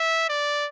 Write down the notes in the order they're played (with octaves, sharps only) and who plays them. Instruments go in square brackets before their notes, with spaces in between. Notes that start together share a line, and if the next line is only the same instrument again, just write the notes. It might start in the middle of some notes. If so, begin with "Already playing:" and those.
Already playing: [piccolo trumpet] E5
D5